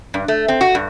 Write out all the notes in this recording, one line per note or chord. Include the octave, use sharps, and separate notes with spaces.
G2
A3
C4
F#4
G2